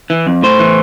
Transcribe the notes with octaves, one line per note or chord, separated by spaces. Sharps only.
E3
F2
A2 C5
E3